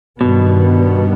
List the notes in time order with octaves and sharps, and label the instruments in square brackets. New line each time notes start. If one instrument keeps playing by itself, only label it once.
[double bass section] G2 D#3 G3 B3 [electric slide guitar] B2